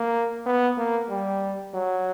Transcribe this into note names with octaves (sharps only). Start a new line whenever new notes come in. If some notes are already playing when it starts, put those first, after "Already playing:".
Already playing: A#3
B3
A#3
G3
F#3